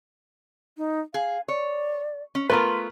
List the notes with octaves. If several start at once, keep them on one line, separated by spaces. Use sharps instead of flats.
D#4
G#4 F5
C#5 D5
C#4
A3 B3 F4 A#4 B4 C6